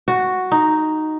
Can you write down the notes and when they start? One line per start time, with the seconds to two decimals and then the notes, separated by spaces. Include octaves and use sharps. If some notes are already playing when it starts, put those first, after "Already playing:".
0.08 F#4
0.52 D#4